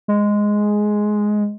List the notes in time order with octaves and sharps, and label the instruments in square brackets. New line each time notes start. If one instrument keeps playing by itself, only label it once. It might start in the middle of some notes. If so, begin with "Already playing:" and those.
[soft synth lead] G#3